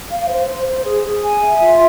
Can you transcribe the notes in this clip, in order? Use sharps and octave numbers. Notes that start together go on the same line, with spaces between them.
F5
C5
C5
C5
G#4
G#4
G#5
E5
F4